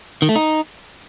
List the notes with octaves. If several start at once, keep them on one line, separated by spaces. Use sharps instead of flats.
D#3
A3
D#4